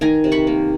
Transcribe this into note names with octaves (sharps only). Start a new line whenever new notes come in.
D#3 G#5 A#5
C3
B5 C#6
A#3